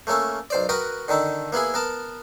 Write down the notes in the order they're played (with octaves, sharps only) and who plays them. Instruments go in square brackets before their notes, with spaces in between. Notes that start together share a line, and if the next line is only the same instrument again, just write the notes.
[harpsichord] A3 A#3 C#4 A4
B1 C5 D5
F#4 A#4 B4 G5 D#6
D3 D#3 D#4 A4
A#3 B3 E4 G#4
B3 A#4 A5